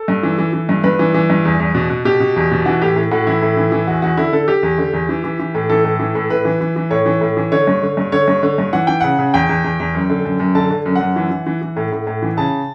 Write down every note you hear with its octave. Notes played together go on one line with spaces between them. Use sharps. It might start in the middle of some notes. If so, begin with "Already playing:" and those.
Already playing: A4
G2
E3
E3
E3
G2
G2 B4
E3
E3
G2
E2
E2
B2
B2
B2 G4
B2
E2
B2
E3 F#4
A2 G4
A2
A2 F#4
E3 E4
A2
E3
E3
E2 F#4
E2 F#4
D3 E4
D3 A4
D3 G4
E2
D3
E2
E3
E3
E3
A2
E3 A4
A2
E3
A2
A2 B4
E3
E3
E3
A2 C#5
E3
A2
E3
D3 C#5
G2
D3
G2
D3 C#5
G2
D3
G2
E3 F#5
E3 G5
C#3 F#5
C#3
E2 G5
E2
E2
E2
F#2
D3
F#2
F#2
D3 A5
D3
F#2
F#5
F#2
E3
E3
E3
E3
A2
A2
A2
E3
C#3 A5